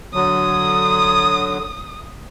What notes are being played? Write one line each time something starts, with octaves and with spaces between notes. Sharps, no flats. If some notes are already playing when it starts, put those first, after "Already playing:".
D3 F#3 D#6